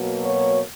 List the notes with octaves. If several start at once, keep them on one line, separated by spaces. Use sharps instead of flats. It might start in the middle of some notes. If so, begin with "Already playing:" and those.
Already playing: B2 F#3 A#3
C#5